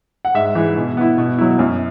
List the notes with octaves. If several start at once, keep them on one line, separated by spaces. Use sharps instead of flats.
F#5
G#2 E5
E3 G#3 E4
B2
B3 E4
B2
F#3 E4
F#2